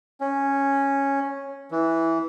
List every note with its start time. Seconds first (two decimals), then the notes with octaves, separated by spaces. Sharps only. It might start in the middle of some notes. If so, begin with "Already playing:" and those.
0.21 C#4
1.71 E3